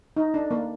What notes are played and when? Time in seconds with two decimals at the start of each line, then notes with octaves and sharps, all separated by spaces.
0.17 D#4
0.34 D4
0.51 A#3